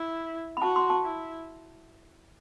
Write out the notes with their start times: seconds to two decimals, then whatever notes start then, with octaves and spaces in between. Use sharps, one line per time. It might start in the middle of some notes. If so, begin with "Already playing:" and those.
Already playing: E4
0.57 B5
0.61 F#4 A5
0.76 C6
0.90 A5
1.03 E4